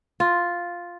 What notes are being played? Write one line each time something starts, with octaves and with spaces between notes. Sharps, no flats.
F4